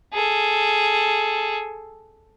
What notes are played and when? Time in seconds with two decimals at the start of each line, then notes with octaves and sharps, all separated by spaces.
0.14 G#4 A4